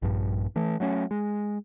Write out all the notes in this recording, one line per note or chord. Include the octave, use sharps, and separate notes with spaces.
A#1 G2
E3 A3
F#3 A3 C#4
G#3